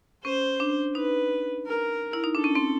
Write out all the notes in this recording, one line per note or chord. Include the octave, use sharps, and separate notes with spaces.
C#4 C5
D4
D#4 B4
A#4
E4
D#4
D4 A4
C#4
C4